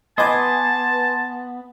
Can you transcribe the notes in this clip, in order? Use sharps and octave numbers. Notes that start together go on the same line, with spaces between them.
B3 B4 D#5 G#5 A5 C6 D6